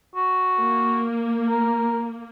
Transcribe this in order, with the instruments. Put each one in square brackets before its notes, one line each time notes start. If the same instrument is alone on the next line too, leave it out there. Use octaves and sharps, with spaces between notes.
[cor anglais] F#4
[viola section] A#3
[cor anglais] A#4